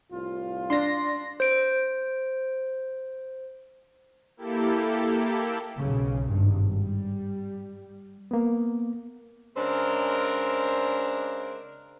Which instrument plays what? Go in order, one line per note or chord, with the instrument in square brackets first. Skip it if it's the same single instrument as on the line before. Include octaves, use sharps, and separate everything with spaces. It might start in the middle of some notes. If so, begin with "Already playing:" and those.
[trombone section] C2 A2 F4
[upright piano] D4 [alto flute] D5 [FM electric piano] C6 A#6
[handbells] C5 D7
[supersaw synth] A#3 E4 G4 A4
[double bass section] B1 C#3
G#1 G2
G3
[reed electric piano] A#3 B3
[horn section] C#3 G#3 C4 D4 A#4